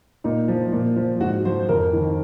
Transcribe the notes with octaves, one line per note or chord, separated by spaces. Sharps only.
A#2 D#4
F3
A#2
F3
G#2 F#4
F3 C5
F2 A#4
D#3